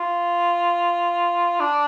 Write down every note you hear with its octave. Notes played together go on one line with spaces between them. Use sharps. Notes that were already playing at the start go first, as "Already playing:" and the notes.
Already playing: F4
D4